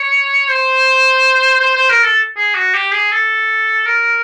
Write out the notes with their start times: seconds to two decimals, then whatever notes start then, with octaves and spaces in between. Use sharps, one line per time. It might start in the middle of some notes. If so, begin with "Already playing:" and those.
Already playing: C#5
0.49 C5
1.61 C5
1.75 C5
1.89 A#4
2.03 A4
2.37 G#4
2.55 F#4
2.74 G4
2.92 G#4
3.11 A4
3.86 A#4